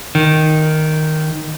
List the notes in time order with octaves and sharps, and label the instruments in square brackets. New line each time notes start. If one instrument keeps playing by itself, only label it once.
[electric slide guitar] D#3